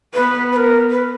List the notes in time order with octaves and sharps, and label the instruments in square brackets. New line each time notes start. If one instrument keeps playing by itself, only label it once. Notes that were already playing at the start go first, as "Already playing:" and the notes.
[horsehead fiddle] B3 [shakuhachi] B4
[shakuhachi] B4
A#4
B4